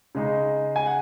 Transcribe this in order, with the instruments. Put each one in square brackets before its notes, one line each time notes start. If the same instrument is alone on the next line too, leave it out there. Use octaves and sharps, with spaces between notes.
[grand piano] C#3 G#3 D#4
G#5
F#5